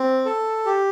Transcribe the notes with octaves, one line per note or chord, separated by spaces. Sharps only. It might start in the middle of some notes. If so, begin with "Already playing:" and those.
Already playing: C4
A4
G4